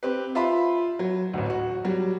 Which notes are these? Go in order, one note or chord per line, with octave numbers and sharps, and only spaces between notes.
C4 G4 B4
F4 E5 B5 C6
F#3
A1 D2
F#4
F#3 G3